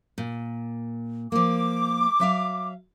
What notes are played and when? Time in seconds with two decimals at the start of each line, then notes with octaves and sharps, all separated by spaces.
0.18 A#2
1.32 F3 A#3 D6
2.20 F#3 E5 F5